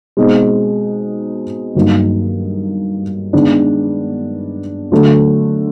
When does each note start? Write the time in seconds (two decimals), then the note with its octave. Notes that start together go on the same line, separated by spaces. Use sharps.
0.17 B2 G#3 C4 D#4
1.75 G2 D#3 F#3 A#3 D#4
3.33 D#3 G#3 B3 D4
4.92 D3 F#3 A3